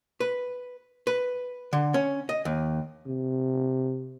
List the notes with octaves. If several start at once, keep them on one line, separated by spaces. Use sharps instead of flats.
B4
B4
D3
C#4
D#5
D#2
C3